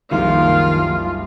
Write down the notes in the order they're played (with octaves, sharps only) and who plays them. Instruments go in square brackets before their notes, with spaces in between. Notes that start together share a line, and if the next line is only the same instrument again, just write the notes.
[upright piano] F#1 C2 E4 [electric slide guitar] D#3 F3 A#3 [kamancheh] F4 [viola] F5